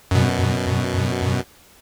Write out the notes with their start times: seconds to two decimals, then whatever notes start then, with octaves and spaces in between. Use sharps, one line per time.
0.11 F#2 B2